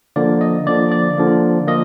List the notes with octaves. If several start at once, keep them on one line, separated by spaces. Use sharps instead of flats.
D3 F3 A#3 D5
D#5
D3 F3 A#3 D5
D5
D3 F3 A#3
F3 A#3 D#5